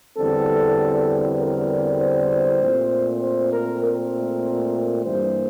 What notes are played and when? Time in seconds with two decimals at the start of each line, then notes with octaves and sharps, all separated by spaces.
0.17 E2 D3 G3 C4 A4
1.39 A#4
2.00 C5
2.60 A#2 A3 C4
3.21 C5
3.52 A#4
3.83 A#4
5.04 G2 E3 G3 A#3 C5